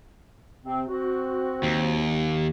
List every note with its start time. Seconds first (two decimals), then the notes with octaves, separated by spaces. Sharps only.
0.64 C3 C4
0.88 C4 F#4
1.63 D#2